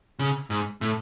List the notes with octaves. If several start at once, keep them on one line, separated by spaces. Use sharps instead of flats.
C#3
G#2
A2